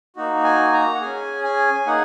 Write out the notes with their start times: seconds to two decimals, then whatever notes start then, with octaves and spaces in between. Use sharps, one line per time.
0.16 A#3 D#4 F#4
0.44 G#5
0.73 A#5
0.95 F#5
1.01 C#4 G#4 G#5
1.44 G#5
1.86 A#3 D#4 G#4 F#5